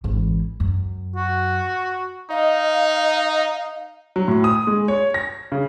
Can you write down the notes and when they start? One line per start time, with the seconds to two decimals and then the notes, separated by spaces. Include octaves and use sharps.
0.04 G#1 E3
0.60 F#2
1.16 F#4
2.30 D#4 D#5 F5
4.16 F#3
4.28 A2
4.44 D#6
4.67 G#3
4.88 C#5
5.14 A#6
5.52 C#3